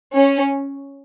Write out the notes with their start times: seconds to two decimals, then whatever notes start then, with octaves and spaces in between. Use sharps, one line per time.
0.15 C#4